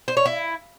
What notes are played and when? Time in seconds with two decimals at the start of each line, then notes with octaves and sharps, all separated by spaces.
0.08 C5
0.17 C#5
0.26 E4